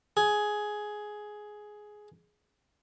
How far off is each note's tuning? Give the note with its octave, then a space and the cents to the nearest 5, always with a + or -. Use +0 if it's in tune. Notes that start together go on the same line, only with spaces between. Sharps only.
G#4 +10